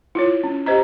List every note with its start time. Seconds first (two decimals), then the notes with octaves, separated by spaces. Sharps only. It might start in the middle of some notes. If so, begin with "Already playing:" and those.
0.15 E4 F4 C#5
0.44 C#4
0.66 G4 C5 D#5 A#5